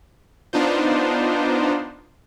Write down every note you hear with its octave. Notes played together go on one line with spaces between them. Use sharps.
B3 D4 D#4 F4 C5